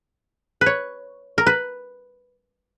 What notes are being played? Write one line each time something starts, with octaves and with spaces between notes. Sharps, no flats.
B4
C#5
A#4
B4